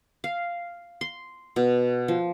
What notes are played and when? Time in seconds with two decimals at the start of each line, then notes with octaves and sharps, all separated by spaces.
0.24 F5
1.01 C6
1.56 B2
2.08 F3